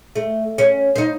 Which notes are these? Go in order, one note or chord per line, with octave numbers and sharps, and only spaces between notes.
A3
C#4
D#4 C5